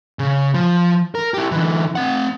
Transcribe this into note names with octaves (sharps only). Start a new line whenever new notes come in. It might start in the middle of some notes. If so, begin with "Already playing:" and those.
C#3
F3
A#4
E4 G4
D3 E3
C4 F#5